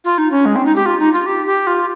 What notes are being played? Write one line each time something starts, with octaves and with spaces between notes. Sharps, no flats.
F4
D#4
C#4
G#3
C4
D#4
G4
F4
D#4
F4
G4
G4
F4